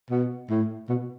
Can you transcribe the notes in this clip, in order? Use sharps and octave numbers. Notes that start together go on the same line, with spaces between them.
B2
A2
B2